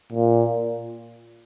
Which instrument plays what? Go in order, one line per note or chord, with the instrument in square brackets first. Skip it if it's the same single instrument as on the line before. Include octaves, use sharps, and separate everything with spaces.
[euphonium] A#2